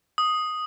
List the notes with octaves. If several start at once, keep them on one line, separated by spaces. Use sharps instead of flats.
D#6